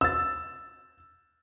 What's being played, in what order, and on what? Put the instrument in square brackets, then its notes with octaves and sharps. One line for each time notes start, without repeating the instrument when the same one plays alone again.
[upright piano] E6 A6